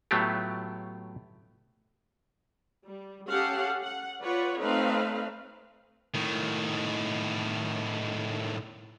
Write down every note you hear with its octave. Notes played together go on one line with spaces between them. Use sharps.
A2 F#3 A3 B3 F4 G4
G3
C#4 G4 A4 F5 F#5
F#5
F4 B4 C#5 D5 F#5
A3 C4 D#4 B4 C#5 F5
A2 D#3